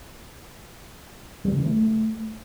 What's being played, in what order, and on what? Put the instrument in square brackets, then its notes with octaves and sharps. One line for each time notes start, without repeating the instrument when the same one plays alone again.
[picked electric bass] G3
C#3
E3
A3